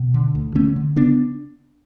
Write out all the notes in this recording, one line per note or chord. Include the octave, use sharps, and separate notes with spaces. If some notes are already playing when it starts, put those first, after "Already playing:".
Already playing: B2
D3
D2
D3 A3 C#4
D3
C#3 B3 D4